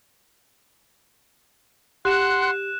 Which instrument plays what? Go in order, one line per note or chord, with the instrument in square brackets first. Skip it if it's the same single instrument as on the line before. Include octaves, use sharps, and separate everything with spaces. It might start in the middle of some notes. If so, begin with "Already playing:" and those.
[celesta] G4 [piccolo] F#5 [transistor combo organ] C6 [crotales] F#6 E7